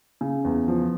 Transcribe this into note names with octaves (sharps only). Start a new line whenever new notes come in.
C#3
E2
F3